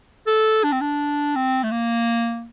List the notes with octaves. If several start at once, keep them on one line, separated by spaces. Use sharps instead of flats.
A4
D4
C4
D4
C4
A3
A#3